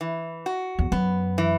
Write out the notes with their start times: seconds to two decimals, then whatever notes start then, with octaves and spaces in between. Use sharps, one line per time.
0.01 E3
0.46 F#4
0.79 E2
0.92 F#2 B3
1.38 E3